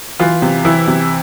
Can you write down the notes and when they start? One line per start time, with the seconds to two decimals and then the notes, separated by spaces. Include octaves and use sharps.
0.20 E3 F4
0.42 C3
0.65 E3 E4
0.88 C3